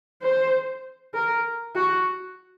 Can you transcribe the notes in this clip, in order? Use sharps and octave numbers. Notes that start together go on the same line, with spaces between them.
C5
A#4
F#4